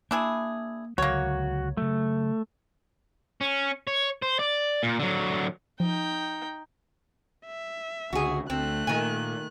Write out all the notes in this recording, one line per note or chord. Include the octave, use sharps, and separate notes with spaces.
A#3 D4 E4 G#4
C#2 D3 F#3 A#3 F#4 C#5
C#3 F#3 A3
C#4
C#5
C5
D5
A#2
D3 F#3
F3 D#4 G5
E5
C#2 D3 F#4 G#4
D2 A3 C4 F#6
A#2 D#3 G#5